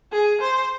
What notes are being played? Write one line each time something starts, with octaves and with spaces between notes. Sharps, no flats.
G#4
C5